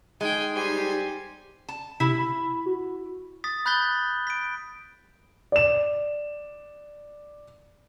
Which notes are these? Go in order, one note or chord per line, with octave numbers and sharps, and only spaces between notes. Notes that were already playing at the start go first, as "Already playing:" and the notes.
G#3 D#4 G5 G#5
G3 G4 C5 G#5
A5
C3 E4
B5
F#4
D#6 A6 B6
B5 F#6 G6 A6 B6 G7
B6 D7
D5 E7